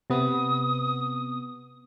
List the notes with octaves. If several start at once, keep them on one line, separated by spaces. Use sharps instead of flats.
C3 B3 D#6